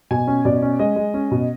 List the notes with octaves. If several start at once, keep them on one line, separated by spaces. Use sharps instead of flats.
B2 G#5
C#4
B2 D5
C#4
G#3 D#5
G#3
C#4
B2